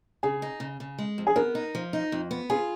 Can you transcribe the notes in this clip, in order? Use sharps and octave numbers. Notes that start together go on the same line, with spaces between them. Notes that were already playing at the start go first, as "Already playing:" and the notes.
C#3 G#4
D#4
C#3
C#3
G#3
F2
G#4
B3 A#4
D#4
F3
D#4
F2
B3
F4 G#4